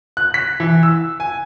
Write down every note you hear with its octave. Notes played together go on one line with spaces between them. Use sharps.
F#6
B6
E3
E6
G#5